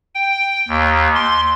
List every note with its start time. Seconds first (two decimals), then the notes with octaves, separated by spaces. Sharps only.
0.15 G5
0.69 D#2
1.15 C6